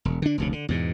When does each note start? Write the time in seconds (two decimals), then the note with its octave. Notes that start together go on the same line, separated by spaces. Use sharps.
0.05 E1
0.22 D3 D4
0.38 F1 D2 C#3
0.53 D3
0.69 E2 G#2 B2